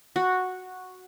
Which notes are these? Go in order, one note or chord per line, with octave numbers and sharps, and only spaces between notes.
F#4